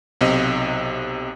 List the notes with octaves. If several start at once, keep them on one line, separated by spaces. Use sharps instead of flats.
B1 C3 D#5